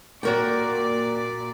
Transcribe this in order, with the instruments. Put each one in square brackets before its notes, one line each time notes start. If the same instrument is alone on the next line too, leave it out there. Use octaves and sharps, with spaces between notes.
[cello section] A#2 D5 [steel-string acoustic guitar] F#4 A#4 G5